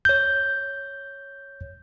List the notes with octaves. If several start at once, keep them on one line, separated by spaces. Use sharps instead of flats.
C#5 G6